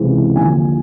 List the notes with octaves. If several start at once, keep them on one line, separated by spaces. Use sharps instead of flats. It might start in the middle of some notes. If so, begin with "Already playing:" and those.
Already playing: C#2 C3 E3
D#2 D3 F3 G#5